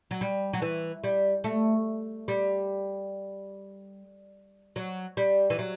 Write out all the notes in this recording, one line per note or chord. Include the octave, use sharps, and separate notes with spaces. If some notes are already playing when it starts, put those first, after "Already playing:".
F#3
G3
F#3
E3
G3
A3
G3
F#3
G3
E3
F#3